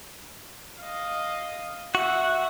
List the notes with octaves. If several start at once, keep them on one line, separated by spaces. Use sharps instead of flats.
D#5 F5
F#4 E5 F#5